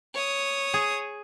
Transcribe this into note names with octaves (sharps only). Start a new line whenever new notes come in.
C#5 D#6
G#4